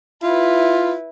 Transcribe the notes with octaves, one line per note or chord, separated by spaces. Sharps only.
E4 F4 B4